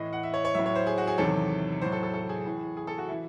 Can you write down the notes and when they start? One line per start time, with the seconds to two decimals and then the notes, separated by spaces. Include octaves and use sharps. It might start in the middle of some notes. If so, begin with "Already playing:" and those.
Already playing: A2 E3 D#5
0.13 F#5
0.23 E5
0.34 C#5
0.45 C#5
0.54 A2 F#3 E5
0.66 C#5
0.75 C5
0.87 G#4
0.98 F#4
1.07 G#4
1.18 E2 C3 D#3 F#3 A4
1.81 A2 F#3 C5
1.92 A4
2.03 A4
2.14 A4
2.29 G#4
2.46 A2 E3
2.77 G#4
2.87 A4
2.98 F#4
3.08 E4
3.11 E3